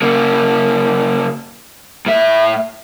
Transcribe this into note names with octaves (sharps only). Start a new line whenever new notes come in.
C#3 A#3
A2 E5